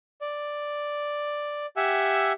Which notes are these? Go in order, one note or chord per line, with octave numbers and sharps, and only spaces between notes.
D5
G4 E5 F#5 G#5 E6